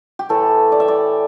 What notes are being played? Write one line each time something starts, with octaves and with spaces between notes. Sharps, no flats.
G4
A2 E3 A3 A4
D5
E5
D5